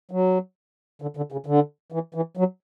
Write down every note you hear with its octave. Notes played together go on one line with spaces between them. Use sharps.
F#3
D3
D3
C#3
D3
E3
E3
F#3